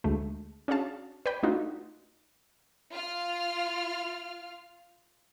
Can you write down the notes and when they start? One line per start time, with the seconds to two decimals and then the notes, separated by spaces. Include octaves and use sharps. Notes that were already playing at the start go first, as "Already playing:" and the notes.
0.04 D2 G#3 A3
0.68 C#4 D4 F#4 G#4 F5 A5
1.26 B4 D5 G5 B5
1.43 A3 D4 D#4 F4 F#4
2.92 F4 F6